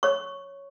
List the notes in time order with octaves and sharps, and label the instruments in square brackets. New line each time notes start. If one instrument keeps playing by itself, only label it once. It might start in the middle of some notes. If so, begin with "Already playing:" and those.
[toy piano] C#5 C#6